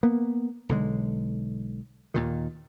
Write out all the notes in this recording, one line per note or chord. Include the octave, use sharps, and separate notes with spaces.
A#3 B3
B1 D3 G#3
D#2 A#2 D#3